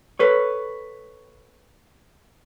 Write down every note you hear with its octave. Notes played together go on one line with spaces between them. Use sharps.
A4 B4 C#5